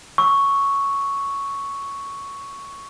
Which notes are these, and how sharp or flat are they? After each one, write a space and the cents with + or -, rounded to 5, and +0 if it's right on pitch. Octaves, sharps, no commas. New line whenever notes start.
C#6 +0 E6 -15